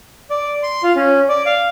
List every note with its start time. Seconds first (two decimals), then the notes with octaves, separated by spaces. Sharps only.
0.30 D5
0.63 C6
0.83 F4
0.96 C#4
1.29 D5
1.46 F5